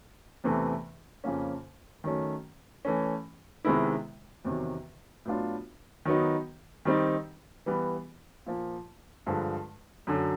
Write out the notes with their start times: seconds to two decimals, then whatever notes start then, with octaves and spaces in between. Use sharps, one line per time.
0.44 E2 C3 E3 A3
1.24 F2 C#3 F3 A#3 C#4
2.04 D#3 F#3 A3 C#4
2.85 E3 A3 C#4
3.65 C3 D#3 G#3 B3 E4
4.45 E2 C3 D#3 F#3
5.25 A2 F#3 B3 D4 F4
6.05 D#3 F#3 B3 D#4
6.85 D#3 G3 C4 D#4
7.66 E3 G3 B3
8.46 A#2 F3 A#3
9.26 G2 D3 F3 G#3
10.07 F#2 D3 F#3